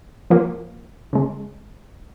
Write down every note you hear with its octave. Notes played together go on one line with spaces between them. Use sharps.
F3 A#3 F4
C#3 G#3